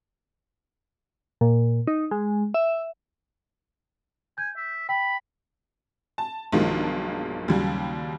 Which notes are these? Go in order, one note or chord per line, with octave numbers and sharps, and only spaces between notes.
A#2
D#4
G#3
E5
G#5 G6
E5
G5 B5
A5
B1 G2 D#3 F3 G#3 A#3
D#2 C#3 F#3 G3